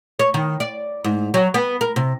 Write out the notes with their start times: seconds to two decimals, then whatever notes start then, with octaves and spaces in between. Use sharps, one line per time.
0.19 C#5
0.34 D#3
0.60 D5
1.04 G#2
1.34 F#3
1.54 B3
1.81 A#4
1.96 C3